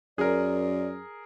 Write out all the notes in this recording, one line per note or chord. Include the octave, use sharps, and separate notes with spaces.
F#2 G#4 A#4 D5